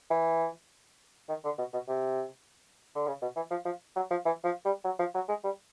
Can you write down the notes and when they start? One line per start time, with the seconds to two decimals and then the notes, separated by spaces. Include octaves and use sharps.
0.11 E3
1.29 D#3
1.44 D3
1.58 B2
1.73 B2
1.88 C3
2.95 D3
3.07 C#3
3.22 B2
3.36 E3
3.51 F3
3.65 F3
3.96 F#3
4.11 F3
4.25 E3
4.44 F3
4.65 G3
4.85 F#3
4.99 F3
5.14 F#3
5.28 G#3
5.44 G3